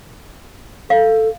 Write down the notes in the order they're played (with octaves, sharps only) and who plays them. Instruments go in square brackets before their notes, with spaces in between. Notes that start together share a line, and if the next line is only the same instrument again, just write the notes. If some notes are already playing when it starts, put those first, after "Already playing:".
[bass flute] A4 [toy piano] F5